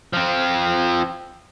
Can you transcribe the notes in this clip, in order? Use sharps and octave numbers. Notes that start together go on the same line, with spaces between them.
F3 C4